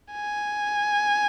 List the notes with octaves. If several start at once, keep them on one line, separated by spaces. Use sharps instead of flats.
G#5